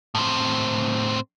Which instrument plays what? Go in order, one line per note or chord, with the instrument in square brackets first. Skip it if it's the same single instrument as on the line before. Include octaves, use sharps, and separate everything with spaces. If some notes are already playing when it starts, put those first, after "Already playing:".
[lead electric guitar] A2 C4